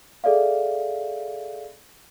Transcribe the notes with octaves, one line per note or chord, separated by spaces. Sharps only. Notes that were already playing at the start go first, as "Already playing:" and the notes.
G#4 A4 D5 E5 F5